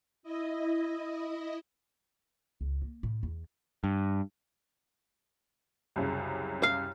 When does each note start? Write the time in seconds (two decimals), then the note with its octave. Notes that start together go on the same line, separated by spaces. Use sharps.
0.23 E4 D#5
2.61 C#2
2.82 A#3
3.03 A2
3.23 E2
3.84 G2
5.96 C2 F#2 C#3
6.63 F5